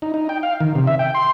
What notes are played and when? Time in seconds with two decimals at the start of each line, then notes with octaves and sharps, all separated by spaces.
0.02 D#4
0.14 D#4
0.29 G5
0.43 F5
0.60 D#3
0.75 C3
0.87 E5
0.99 G5
1.14 C6